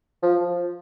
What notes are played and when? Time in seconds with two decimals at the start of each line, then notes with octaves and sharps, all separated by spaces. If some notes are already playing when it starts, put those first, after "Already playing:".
0.23 F3